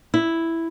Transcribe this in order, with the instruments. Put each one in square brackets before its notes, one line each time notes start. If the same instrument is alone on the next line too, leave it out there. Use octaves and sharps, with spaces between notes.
[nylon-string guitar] E4